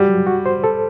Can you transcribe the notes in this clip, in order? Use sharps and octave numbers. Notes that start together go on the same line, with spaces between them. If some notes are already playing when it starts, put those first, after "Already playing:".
Already playing: G3 F#4
F#3
F#4
C5
A4